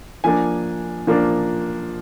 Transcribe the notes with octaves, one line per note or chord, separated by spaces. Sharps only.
F3 A#3 D4 G#5
F3 A#3 D4